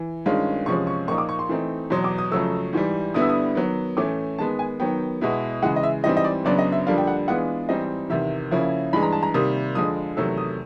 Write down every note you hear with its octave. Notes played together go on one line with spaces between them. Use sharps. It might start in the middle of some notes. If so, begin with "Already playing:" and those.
Already playing: E3
G2 D#3 G#3 C#4 F4
E2 C3 F3 G#3 C#4 C#6
C#6
A#2 F3 A#3 D#4 C#6
D6
C#6
C6
E3 A3 C4 D#4
E2 B2 F#3 C6
D6
D#6
F2 C#3 F#3 A3 E6
G#2 E3 G3
G2 D3 G3 B3 E4 D#6
E6
D#6
D#3 F#3 B3
A2 E3 A3 C#4 D6
D#3 G#3 B3 A5
G#5
D#3 F#3 B3 G5
B2 G#3 B3 E4
C#3 E3 G#3 F#5
D#5
E5
G#2 E3 G3 C4 D#5
D#5
D5
F#2 C#3 F#3 B3 D4 D5
D#5
E5
F2 D3 G3 A#3 D4 F5
G5
F#5
E3 G#3 B3 D4 F4 F#5
G#2 E3 G3 C4 D#4 D#5
E2 C3 D#3 E5
C#3 F3 A#3 C#4 E4
G2 E3 G#3 B5
A#5
A5
A#5
C3 D#3 G3 A#3 D#6
F2 D3 F3 G#3 D#6
E2 C3 D#3 F#3 A3 E6
D#6